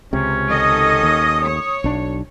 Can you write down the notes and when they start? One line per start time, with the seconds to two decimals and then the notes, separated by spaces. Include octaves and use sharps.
0.13 C#2 C3 C#4
0.49 D#3 A4 D#5 D#6
1.03 D#2
1.44 C#5
1.84 B1 D4